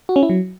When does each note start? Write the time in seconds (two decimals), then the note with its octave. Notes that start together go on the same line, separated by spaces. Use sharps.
0.09 F#4
0.16 C#4
0.23 E4
0.30 F#3